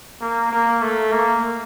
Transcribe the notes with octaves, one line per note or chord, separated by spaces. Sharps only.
A#3
A#3
A3
A#3